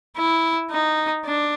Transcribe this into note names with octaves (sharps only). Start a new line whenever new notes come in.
E4
D#4
D4